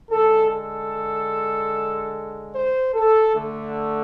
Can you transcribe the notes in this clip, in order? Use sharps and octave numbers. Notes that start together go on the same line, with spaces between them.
D3 G#3 A4
A4
C5
A4
D3 A3